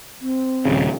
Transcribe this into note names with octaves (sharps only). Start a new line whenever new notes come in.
C4
D#1 G#1 C#3